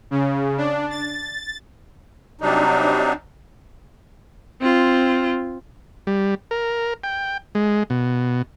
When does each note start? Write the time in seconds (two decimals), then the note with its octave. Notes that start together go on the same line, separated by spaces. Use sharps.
0.11 C#3
0.57 D4
0.90 A6
2.41 C3 F#3 G3 D4 D#4
4.61 C4 F4
6.07 G3
6.51 A#4
7.04 G5
7.55 G#3
7.90 B2